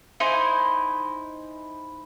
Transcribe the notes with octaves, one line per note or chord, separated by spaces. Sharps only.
D#4 E4 C5 G#5